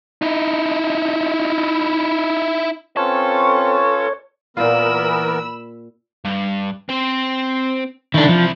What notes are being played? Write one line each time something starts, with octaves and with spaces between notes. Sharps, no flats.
D#4 E4
C4 C#4 F4 A4 B4 C#5
A#2 E3 B3 F4 A#4 B5 E6
G2
C4 C5
C2 D#3 D4 E4
F3